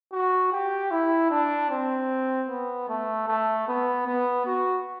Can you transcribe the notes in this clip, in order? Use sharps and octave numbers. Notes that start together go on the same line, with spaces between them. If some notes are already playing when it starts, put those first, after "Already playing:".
F#4
G4
E4
D4
C4
B3
A3
A3
B3
B3
F#4